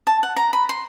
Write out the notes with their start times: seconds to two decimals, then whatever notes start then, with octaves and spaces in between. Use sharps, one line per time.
0.07 A5
0.23 F#5
0.36 A#5
0.53 B5
0.69 C6